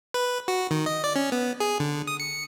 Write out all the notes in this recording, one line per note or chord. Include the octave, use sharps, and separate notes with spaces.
B4
F#4
D#3
D#5
D5
C#4
B3
G#4
D3
D#6
C#7